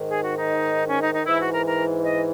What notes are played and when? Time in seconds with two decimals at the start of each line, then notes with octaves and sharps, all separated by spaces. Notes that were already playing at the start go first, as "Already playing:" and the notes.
Already playing: G#2 D#3
0.09 G#4
0.23 F#4
0.35 D#4
0.88 C#4
1.01 D#4
1.13 D#4
1.26 G#2 E3 E4
1.39 F#4
1.53 A#4
1.66 A#4
2.04 D#5